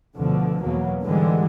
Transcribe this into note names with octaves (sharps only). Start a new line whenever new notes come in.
D2 B2 D3 F3
E2 B2 F#3 A#3 B3
G#2 D3 E3 G3 G#3